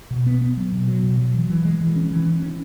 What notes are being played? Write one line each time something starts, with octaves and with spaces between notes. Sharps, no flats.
B2
B3
B3
F#3
B2
F#3
B2
F#3
E3
E3
G#3
E3
C#4
E3
C#4
C#4